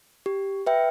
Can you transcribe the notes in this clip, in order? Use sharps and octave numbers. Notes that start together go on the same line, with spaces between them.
G4
B4 E5 G5